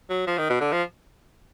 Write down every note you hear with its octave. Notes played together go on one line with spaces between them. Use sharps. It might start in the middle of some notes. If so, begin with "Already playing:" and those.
F#3
F3
D#3
B2
D3
F3